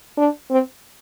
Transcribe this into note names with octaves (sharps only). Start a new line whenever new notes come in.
D4
C4